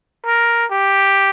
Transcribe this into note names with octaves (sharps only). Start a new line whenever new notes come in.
A#4
G4